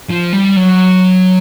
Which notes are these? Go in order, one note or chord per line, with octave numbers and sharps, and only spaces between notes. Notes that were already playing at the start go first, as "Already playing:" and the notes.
F3
G3
F#3